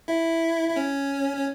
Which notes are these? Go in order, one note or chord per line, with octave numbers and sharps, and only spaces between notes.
E4
E4
C#4
C#4